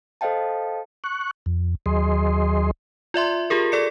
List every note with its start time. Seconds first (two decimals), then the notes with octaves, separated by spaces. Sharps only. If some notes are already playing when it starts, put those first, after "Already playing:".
0.21 A4 C5 D#5 F5 G5 A5
1.04 C#6 F#6
1.46 F2
1.86 D#2 F#3 G#4 D#5 C6
3.14 F4 D5 E5 C6
3.50 F4 G4 G#4 A#4
3.72 A4 D5 C#7